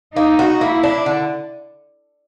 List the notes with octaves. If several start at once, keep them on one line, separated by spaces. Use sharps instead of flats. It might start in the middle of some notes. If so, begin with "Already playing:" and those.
A#3 D#4
F#4
A#3 E4
D4
D3